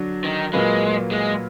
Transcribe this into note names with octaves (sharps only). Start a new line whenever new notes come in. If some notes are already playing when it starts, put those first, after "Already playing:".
Already playing: D3 F#3 D4 F#4
D#3
A#2 F#3 G#3 A#3 F4 B4
G#3